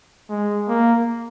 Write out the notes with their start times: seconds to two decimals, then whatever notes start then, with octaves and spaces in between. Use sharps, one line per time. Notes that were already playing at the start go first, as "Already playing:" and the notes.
0.30 G#3
0.68 A#3